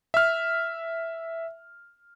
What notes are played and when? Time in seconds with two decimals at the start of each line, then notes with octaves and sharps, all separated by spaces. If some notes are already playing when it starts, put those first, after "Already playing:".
0.14 E5 F6